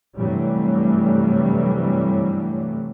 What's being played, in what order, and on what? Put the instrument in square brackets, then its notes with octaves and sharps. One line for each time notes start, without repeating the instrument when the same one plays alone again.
[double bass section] G2 C3 E3 F#3 G3 A3